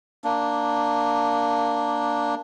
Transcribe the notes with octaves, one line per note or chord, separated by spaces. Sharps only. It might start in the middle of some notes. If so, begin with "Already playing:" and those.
A#3 D4